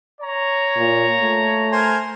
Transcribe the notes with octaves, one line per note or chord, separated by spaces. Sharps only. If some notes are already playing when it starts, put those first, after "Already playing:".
C#5 A#5
A#2
A3
A#4 C5 G#5